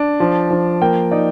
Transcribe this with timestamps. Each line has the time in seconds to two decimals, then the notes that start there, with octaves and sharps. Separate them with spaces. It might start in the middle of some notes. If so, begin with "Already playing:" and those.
Already playing: D4
0.20 F3
0.51 F3
0.82 A#3 G5
1.11 D#4 D5